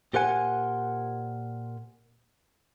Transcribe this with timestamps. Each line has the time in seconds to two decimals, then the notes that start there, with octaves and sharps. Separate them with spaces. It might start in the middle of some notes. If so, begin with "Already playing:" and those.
0.13 A#2 G4 A#4 C5 F#5 G#5